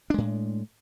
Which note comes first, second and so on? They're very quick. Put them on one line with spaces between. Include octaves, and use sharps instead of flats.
D4 G#3 A2